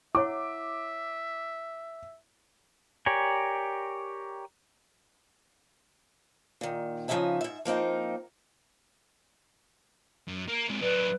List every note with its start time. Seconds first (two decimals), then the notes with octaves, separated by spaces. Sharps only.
0.15 E4 C#5 E5 F#5 D6
3.06 G4 A#4 C#5 D5 G#5
6.61 A#2 D#3
7.08 C#3 F3 F#3 D#4 E5 G#5
7.41 G#2 E5
7.65 F3 A#3 C4 D#4
10.28 F#2
10.49 A#3
10.69 C3 G#3
10.81 F#3 D4 B4